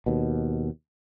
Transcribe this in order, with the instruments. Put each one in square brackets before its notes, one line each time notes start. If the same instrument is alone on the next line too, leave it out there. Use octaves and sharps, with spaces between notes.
[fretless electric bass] D#2 B2